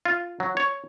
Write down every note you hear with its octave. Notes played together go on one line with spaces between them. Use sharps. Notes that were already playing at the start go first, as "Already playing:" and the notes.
F4
F#3
C#5